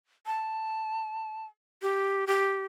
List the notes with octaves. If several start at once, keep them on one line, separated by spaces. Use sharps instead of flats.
A5
G4
G4